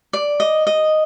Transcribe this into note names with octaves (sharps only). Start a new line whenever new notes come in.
D5
D#5
D#5